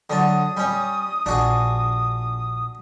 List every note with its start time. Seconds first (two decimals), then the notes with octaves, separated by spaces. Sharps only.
0.10 D3 F#3 A5 D#6
0.57 G3 C#4
1.26 A#1 D4 F#4 G#4